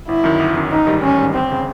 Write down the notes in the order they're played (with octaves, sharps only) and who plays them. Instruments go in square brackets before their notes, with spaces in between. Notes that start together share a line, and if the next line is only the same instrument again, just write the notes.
[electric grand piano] G1 [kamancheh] E4
[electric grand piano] F#2 D#3
G1
F#2 D#3
[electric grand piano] A1 [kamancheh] D#4
[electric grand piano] G#2 D#3 G3
[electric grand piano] A1 [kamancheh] C#4
[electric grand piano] G#2 D#3 G3
[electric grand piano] G1 [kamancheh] C4
[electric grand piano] C#3